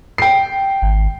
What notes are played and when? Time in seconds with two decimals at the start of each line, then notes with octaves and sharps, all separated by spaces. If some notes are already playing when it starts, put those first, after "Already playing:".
0.18 G5 C7
0.82 G#1